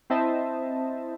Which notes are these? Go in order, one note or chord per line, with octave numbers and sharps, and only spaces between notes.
C4 E4 C5 D#5 E5 A5